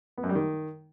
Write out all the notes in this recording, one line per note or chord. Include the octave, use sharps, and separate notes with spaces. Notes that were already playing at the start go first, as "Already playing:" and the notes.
B3
F#2
G3
D#3